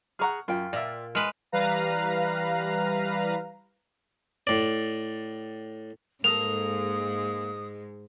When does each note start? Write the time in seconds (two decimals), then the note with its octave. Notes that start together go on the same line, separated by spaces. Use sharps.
0.19 G#4 F#5 A#5 C#6 F6
0.48 F#2 F4 G5
0.73 A#2 D5 E5
1.15 G#3 B4 F6
1.52 E3 G3 B4 F5 A#5
4.47 A2 D5
6.24 G#2 G#3 A#3 A4 D#6 F7